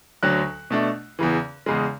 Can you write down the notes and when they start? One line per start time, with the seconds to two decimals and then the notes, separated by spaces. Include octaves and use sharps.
0.23 D2 D3 F#3 F#6
0.70 B2 A3 D4
1.19 E2 C#3 E3
1.66 E2 C#3 G#3